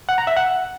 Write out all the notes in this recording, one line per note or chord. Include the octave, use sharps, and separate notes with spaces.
F#5
A#5
E5
F#5